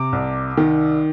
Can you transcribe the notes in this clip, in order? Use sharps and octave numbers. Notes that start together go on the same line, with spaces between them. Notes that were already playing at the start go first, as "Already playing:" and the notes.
Already playing: C3 D6
C2
D#3